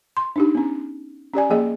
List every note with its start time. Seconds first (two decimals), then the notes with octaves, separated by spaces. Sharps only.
0.17 C6
0.36 D4 D#4 G4
0.55 B3 C#4
1.34 C#4 G4 D5 G#5
1.50 F3 A#3 G#4 D#5